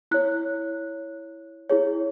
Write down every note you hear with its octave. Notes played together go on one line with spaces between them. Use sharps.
E4 C#5 F#6
E4 G#4 C#5